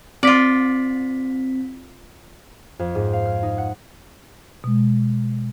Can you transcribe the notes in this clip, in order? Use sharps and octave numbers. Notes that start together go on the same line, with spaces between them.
C4 F4 D5 B6
F2
G#2
F5
F6
D#4
F#5
B2 G#3